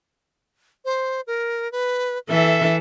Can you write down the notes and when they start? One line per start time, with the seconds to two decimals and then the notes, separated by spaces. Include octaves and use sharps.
0.85 C5
1.27 A#4
1.72 B4
2.30 E3 A4 E5